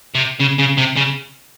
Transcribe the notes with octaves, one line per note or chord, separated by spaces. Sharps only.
C3
C#3
C#3
C3
C#3